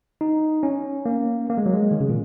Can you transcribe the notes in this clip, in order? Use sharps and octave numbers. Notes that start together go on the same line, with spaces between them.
D#4
C#4
A#3
A#3
G#3
F#3
G#3
D#3
C#3
A#2